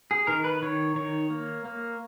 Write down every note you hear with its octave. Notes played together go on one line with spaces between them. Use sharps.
G#4
D#3 A#4
B4
D#3 C#5
D#3 C#5
A#3
A#3